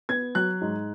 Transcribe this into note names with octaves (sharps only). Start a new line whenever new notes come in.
B3 G#6
F#3 F#6
G#2